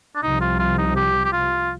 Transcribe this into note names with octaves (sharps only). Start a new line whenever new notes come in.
D4
C2 C3 F3 D#4
F4
F4
D#4
G4
G4
F4